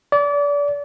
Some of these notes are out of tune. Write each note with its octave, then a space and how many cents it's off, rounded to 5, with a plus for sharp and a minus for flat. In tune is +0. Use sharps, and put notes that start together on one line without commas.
D5 -30